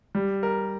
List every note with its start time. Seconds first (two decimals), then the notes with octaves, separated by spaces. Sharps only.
0.15 G3
0.43 A#4